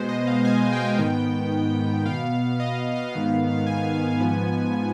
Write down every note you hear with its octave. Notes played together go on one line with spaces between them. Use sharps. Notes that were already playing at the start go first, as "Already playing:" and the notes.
Already playing: B2 G#3 B3 C5
D#5
F5
G#5
G5
G#2 D#3 B3 G5
B2 B3 F5
D#5
D#5
F5
G#2 D#3 B3
G#5
G#2 F3 B3